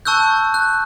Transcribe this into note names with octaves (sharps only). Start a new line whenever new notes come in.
A5 C#6 E6 F#6 G6
F#6